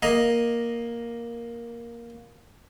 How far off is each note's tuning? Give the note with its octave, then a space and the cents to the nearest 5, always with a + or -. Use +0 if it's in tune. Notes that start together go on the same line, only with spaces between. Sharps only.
A#3 +5 D#5 +0